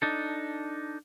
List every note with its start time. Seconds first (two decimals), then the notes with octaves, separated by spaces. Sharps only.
0.02 D4 D#4 A4